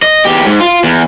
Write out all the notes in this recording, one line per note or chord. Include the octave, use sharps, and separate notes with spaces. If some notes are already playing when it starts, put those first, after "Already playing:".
D#5
E2 G4
G#2
F4
E2